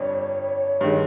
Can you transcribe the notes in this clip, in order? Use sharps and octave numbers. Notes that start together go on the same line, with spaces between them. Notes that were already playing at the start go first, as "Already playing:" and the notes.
Already playing: G1 F2 G3 C#5
G2 D#3 G#3